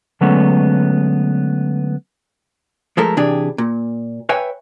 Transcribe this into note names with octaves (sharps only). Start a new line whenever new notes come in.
D3 F#3 G#3 A3 B3 C#4
F3 G#3 A3 A4 A#4
C3 E3 D4 G4 G#4
A#2
B4 C#5 E5 G5 G#5